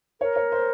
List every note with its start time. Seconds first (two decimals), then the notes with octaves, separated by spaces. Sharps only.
0.21 A#4 C#5
0.36 C#5
0.52 C5